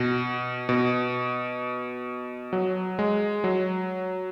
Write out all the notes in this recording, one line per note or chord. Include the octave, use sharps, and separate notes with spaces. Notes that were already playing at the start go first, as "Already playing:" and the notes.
Already playing: B2
B2
F#3
G#3
F#3